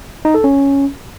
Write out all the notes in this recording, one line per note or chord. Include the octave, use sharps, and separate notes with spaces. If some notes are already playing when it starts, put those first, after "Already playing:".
D#4
A4
C#4